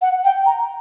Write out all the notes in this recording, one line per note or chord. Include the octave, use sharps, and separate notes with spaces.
F#5
G5
A#5